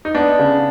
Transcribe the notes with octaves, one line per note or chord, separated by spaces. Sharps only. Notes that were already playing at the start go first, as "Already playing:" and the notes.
D#4
B3 D4
C#3